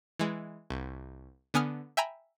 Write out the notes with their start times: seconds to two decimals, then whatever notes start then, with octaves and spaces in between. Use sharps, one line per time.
0.19 E3 G#3
0.70 C2
1.54 D3 B3 G#5 D#6 F6
1.97 E5 G5 G#5 A#5 B5